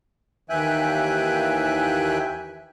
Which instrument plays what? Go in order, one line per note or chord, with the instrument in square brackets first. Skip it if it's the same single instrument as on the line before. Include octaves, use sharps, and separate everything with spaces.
[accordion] D#2 E3 E5 G5 G#5 F#6